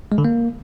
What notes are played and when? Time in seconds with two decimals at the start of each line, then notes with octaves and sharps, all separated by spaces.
0.12 G#3
0.18 D3
0.25 A#3